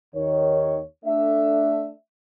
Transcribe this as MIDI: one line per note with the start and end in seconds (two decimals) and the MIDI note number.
0.15 0.81 39
0.15 0.81 51
0.15 0.81 73
1.05 1.90 57
1.05 1.90 62
1.05 1.90 76